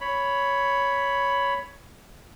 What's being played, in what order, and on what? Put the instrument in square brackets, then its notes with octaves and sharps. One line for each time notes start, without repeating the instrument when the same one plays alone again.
[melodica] C#5 B5